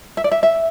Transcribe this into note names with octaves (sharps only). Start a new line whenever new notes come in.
E5
D5
E5
E5